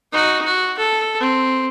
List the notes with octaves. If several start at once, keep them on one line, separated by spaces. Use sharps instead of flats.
D#4 F#4
F#4
A4
C4